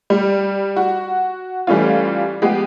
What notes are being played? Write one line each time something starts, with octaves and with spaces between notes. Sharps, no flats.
G3
F#4
E3 G3 A3 C#4 F4
F3 G#3 B3 G4